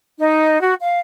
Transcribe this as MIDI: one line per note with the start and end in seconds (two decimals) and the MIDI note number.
0.19 0.61 63
0.62 0.73 66
0.81 0.98 77